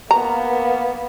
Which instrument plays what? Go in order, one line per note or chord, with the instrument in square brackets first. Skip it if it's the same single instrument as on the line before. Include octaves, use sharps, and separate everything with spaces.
[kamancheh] A#3 B3 [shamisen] A#5